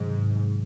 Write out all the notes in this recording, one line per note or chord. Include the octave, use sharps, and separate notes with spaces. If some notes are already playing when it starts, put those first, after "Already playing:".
Already playing: G#2 C3 D#3 F#3